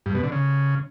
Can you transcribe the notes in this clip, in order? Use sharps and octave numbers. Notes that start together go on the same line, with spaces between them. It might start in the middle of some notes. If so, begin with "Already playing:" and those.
G2
B2
D3
C#3